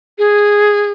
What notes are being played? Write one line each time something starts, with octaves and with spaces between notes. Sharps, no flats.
G#4